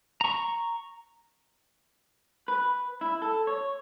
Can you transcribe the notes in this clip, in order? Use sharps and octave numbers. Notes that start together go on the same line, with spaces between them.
A#5 C#6
B4
E4
A4
C#5